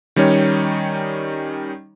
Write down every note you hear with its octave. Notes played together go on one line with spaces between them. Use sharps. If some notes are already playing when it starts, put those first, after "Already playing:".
D#3 G3 C#4 D#4 C#5